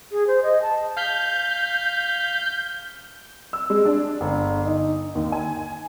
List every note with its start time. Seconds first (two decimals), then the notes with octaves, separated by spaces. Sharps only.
0.12 G#4
0.27 C5
0.43 D#5
0.62 A5
0.97 F5 F6 G6 B6
3.53 E6
3.70 G#3
3.86 D4
4.21 G1
4.66 D#4
5.15 D#2
5.32 G#5